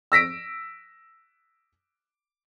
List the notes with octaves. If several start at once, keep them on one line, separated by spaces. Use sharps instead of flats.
E6 A#6 B6 D7